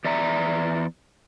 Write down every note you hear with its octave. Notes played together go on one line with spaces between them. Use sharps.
E2 D5 E5 A#5